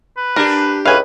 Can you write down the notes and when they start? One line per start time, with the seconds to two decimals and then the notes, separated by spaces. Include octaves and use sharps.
0.17 B4
0.36 D4 G4 A#4
0.85 C#2 A2 B4 F5 G#5